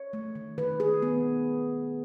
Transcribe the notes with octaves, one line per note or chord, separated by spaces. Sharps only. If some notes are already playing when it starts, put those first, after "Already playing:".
Already playing: C#5
A3
D#3
D#3 B4
D#3 G#4
D#3 B3